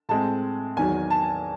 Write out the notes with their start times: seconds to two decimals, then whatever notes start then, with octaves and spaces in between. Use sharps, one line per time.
0.09 A2 G#3 C4 A5
0.77 E2 D#3 F#3 G#5
1.10 A5